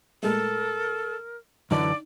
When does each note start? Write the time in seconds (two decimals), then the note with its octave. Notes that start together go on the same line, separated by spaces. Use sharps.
0.23 A#2 G#3 A3 A4 A#4
1.71 F#2 D3 E3 D#4 D5